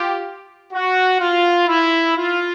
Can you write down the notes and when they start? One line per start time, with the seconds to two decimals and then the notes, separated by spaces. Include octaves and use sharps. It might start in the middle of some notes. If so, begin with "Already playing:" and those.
Already playing: F4 G4
0.73 F#4
1.20 F4
1.67 E4
2.16 F4